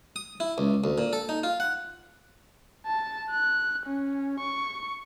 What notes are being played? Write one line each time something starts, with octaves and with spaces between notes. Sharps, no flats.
D#6
E4
C#2
D2
A#2
A4
D#4
F4
F#5
A5
F#6
C#4
C#6